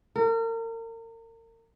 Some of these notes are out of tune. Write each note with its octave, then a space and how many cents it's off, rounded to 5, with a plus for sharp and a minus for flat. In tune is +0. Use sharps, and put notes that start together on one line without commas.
A#4 -35